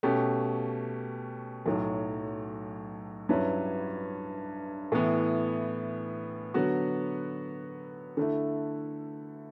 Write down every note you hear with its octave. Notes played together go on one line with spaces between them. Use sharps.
B2 A3 C#4 G4
B1 A2 F#3
G2 F#3 C#4 E4 B4
A2 E3 B3
D3 F#3 B3 F#4
D3 A3 E4